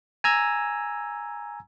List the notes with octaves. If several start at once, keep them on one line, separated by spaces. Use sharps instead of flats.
G#5 A#5 E6 G#6